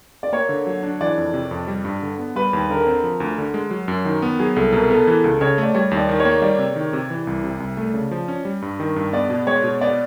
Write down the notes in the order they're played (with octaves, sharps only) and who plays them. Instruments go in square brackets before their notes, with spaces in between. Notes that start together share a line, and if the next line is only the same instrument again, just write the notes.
[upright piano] D5
[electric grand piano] A#3 [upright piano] C#5
[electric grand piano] D3
F#3
D4
[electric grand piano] E3 [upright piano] D5
[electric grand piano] F2
C3
F2
G3
G2
D3
B3
[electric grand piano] G3 [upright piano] B4
[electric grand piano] D#2
[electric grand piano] D3 [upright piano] A#4
[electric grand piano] C4
F3
D2
D3
G#3
F#3
F#2
D#3
B3
[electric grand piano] F#3 [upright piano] G#4
[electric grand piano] C2 [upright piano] A4
[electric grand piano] B2 [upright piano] A#4
[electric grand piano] B3 [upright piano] A4
[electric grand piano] E3
C#2
[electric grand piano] C#3 [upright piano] C#5
[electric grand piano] A3 [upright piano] D5
[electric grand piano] G3 [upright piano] C#5
[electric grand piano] D#2
[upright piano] D5
[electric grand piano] D#3
[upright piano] C#5
[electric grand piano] A#3
[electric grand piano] G3 [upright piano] D5
[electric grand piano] C3
D#3
C3
E3
C2
C3
C2
A3
C#3
F3
C#4
G3
G2
D#3
G2
[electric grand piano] B3 [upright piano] D5
[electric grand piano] B2
[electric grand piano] G#3 [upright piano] C#5
[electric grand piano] B2
[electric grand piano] B3 [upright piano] D5